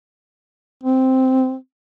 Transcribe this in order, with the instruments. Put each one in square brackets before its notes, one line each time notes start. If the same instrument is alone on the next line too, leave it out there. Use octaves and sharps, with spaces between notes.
[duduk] C4